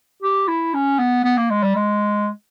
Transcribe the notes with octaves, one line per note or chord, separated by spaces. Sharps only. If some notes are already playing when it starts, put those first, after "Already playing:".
G4
E4
C#4
B3
B3
A#3
G#3
G3
G#3